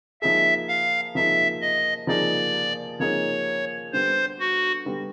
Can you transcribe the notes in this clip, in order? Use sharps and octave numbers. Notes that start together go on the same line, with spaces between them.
F3 A#3 D#4 G#4 E5
F5
F3 A#3 D#4 G#4 E5
D#5
F3 A#3 D#4 G#4 D5
F3 A#3 D#4 G#4 C#5
D3 G3 B3 C5
F#4
D3 G3 B3